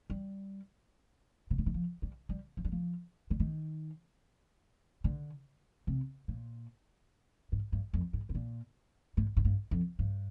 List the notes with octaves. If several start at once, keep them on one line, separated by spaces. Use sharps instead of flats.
G3
C3
D3
D#3
F3
G3
G3
F3
G3
F3
D3
D#3
D3
C3
A#2
G#2
G2
F2
G#2
C3
A#2
G#2
G#2
G2
F2
G2